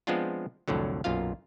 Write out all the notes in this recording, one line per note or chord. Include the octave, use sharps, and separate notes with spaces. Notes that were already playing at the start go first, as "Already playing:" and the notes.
F3 G#3 B3 C4 D4 F4
C2 F2 A2 D3 F#3
B1 F#2 A#2 F4 F5